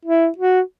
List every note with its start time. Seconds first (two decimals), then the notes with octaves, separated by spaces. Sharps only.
0.05 E4
0.38 F#4